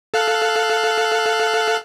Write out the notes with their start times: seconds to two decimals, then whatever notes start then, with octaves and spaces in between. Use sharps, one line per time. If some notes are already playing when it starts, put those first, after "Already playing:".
0.14 A4 F5 F#6